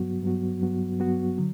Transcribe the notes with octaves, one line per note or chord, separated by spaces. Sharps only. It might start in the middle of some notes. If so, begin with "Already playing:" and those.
Already playing: G2 F#3 B3 F#4
G2 F#3 B3 F#4
G2 F#3 B3 F#4
G2 F#3 B3 F#4
D3 F#3